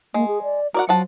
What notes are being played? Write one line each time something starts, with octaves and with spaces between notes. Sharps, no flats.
G#3 A#3
G#4
D5
F#4 A#4 D5 F#5
F3 F#3 F#5 A5